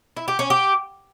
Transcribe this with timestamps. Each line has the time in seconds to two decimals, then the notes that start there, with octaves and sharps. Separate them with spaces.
0.16 E4
0.28 G4
0.39 C#4
0.50 G4